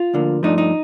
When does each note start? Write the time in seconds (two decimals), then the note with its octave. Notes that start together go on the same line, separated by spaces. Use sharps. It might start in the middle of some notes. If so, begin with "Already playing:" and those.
Already playing: F4
0.14 D2 D3 F3 A#3
0.43 G2 F3 A3 D4 D#4
0.58 D#4